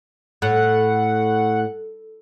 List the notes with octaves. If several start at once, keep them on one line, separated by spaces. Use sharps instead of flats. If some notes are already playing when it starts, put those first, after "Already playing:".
A2 F#5